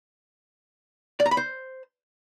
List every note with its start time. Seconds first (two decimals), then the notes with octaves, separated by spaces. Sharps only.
1.20 D5
1.26 A#5
1.31 B5
1.37 C5